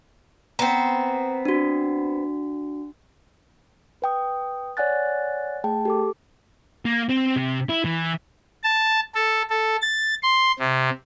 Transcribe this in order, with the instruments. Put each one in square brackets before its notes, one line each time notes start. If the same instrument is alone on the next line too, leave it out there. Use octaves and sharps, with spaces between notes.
[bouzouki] B3 C4 [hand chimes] A#5
[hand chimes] D4 F#4
B4 G5 D#6
C#5 D5 F#5 G#5 F#6 A6
A3 G#4 G5 A5
G4 A4 D6
[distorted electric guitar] A#3
C4
C3
E4
E3
[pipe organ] A5
A4
A4
A6
C6
C3